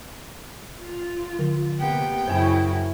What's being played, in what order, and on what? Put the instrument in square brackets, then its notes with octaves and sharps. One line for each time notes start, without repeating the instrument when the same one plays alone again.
[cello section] F4
[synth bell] D3
[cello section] C3 A#3 G4 [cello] B3 [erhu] G5
[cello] F#2 C#3 [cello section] E4 F#4 [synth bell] C5 G#5